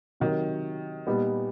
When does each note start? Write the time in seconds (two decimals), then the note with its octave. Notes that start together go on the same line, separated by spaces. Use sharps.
0.20 C3 D#3 F#3
1.07 A#2 G3 B3 D#4